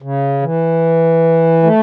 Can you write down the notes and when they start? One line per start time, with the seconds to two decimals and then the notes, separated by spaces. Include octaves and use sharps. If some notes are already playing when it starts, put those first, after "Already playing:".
0.02 C#3
0.42 E3
1.63 A3